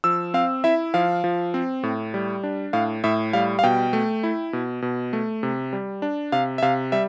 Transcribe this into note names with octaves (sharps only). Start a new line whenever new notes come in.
F3 E6
C4 F5
E4 E5
F3 F5
F3
C4
A2
G3
D4
A2 F5
A2 E5
G3 F5
F5
B2 G5
A3
E4
B2
B2
A3
C3
G3
D4
C3 F5
E5
C3 F5
G3 E5